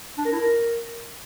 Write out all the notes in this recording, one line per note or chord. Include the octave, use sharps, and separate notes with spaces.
D4
A#4
E4
A#4